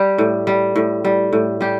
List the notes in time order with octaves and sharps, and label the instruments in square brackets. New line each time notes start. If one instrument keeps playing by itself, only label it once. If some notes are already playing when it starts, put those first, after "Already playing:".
Already playing: [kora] G3 G4
A2
G3
A2
G3
A2
G3 G4